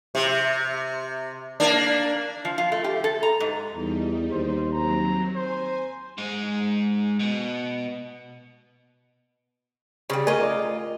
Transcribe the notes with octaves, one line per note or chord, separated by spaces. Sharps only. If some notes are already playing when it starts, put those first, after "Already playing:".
C3
A#3 D4
F3
F4
A3
G4
A4
A#5
G#2
E2 G3 D#4
D#2 C5
F#3 C4 A#5
C5 G#5
G#2 G#3
B2
C#3 G3 G#4
A3 F4 A#4 D#5 G#5
A#4 D5